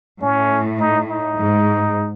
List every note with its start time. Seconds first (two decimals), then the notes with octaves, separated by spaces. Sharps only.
0.21 A2 C#4
0.80 D#4
1.09 D#4
1.38 G#2